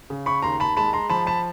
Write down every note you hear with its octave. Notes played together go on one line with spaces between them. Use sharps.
C#3
B5 C#6
D#2 A#5 C6
A5 B5
G#3 A5 B5
A#5 C6
F3 A5 B5
A5 B5